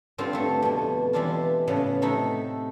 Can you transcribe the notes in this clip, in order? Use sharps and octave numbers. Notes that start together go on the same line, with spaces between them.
G2 D3 C4 F4 C5
G2 A3
F2 B2
E3 G3 G#3 D4 E4 F4
A2 C#3 F3 B3 B4
C3 A3 D#4 E4 B5